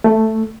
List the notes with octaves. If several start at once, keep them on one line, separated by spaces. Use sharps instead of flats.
A3